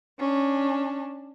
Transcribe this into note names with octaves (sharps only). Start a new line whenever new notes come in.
C#4 D4